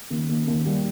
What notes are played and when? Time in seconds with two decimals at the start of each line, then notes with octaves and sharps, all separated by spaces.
0.10 D#2
0.29 D#2
0.47 D#2
0.66 G3